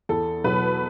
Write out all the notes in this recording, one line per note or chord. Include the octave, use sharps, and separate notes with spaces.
E2 A4
B2 F#3 B4